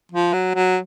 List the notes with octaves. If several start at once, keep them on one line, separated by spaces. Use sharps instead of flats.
F3
F#3
F#3